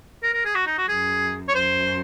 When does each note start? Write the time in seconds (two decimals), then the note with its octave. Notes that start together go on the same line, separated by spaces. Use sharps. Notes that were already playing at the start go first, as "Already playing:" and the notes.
0.23 A#4
0.34 A#4
0.45 G#4
0.55 F#4
0.66 D#4
0.78 F#4
0.89 F#2 G#4
1.49 C#5
1.54 F#2 C5